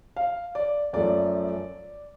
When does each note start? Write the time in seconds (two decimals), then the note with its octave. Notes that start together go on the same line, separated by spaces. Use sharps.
0.16 F5
0.55 D5
0.93 F#2 F3 A3 D5